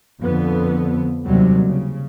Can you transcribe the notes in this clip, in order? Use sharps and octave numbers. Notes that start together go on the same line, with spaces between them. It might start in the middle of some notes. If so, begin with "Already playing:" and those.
F2 D3 B3
D#2 C3 F#3 G3
C#3